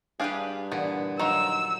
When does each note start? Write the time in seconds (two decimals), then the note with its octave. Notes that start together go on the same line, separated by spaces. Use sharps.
0.20 G2 D4 G4 G#4 B4 F5
0.72 A#2 D3 E3 B3
1.19 F3 F#3 D#4 F4 E6